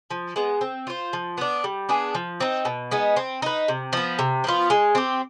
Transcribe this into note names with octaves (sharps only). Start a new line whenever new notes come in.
F3
G#3 B3
C4
F4 C5
F3
B3 D4
G3
B3 D4 G#4
F3
C4 D#4
B2
G#3 B3 D#4
C4
D#4 B4
C3
F3 B3
C3
F3 B3 F4
G#3
C4 G4